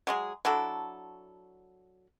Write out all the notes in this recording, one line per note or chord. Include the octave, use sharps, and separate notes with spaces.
F#3 G#3 G#4
F#3 D4 E4 A4